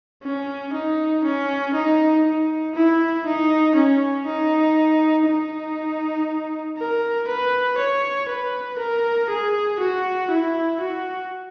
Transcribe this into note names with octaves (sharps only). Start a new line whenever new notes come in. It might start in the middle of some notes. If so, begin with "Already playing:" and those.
C#4
D#4
C#4
D#4
D#4
E4
D#4
C#4
D#4
D#4
A#4
B4
C#5
B4
A#4
G#4
F#4
E4
F#4